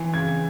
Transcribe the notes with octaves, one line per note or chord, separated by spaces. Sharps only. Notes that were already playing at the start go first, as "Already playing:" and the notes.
Already playing: E3
C#3 G#6